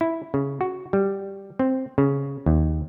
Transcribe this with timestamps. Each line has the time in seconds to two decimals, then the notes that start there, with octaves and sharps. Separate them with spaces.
0.01 E4
0.34 C#3
0.61 F#4
0.93 G3
1.59 C4
1.98 C#3
2.46 D#2